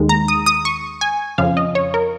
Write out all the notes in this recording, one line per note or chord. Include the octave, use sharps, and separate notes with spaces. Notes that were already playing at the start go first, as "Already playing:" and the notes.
Already playing: D#2 D#3 G#3
A#5
D#6
D#6
C#6
G#5
F2 C#3 F3 F5
D#5
C#5
A#4